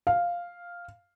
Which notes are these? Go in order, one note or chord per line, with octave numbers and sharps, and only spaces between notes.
F5